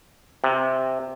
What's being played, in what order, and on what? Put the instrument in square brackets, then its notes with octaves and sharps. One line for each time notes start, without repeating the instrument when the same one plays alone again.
[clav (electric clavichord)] C3